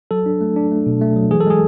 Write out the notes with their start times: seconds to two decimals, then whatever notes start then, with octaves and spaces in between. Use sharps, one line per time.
0.11 F#3 A4
0.26 D4
0.41 A3
0.56 D4
0.71 A3
0.86 B2
1.01 A3
1.16 F#3
1.31 E3 G#4
1.41 A4
1.46 G#3 G#4